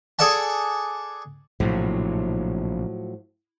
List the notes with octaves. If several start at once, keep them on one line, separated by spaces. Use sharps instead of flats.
G#4 A4 D5 F#5 A5
A#1 A2 C3 F3 F#3